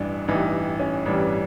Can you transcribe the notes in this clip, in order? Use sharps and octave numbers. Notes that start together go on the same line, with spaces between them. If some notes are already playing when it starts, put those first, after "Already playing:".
Already playing: A1 G2 E3 G3 D4
A1 G2 E3 G3 D#4
C#4
A1 G2 E3 G3 D4